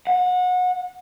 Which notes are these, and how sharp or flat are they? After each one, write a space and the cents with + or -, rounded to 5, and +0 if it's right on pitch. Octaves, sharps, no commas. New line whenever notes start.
F#5 -30